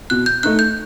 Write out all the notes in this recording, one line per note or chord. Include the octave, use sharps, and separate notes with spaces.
B2 F#6
G6
A3 D#4 F#6
G6